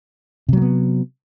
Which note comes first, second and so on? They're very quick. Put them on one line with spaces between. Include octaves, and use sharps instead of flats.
C3 F#3 A#3 B3